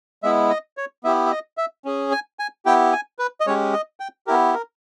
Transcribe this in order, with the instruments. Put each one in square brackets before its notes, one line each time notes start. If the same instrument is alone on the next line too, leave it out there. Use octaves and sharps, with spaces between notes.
[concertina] G#3 B3 E4 E5
D#5
C#5
B3 E4 G4 E5
E5
D#5
E5
C#4 G#4
G#5
G#5
B3 E4 G4 G5
G#5
B4
D#5
G#3 C#4 G4 C#5
D#5
G5
B3 E4 G4 A#4
A#4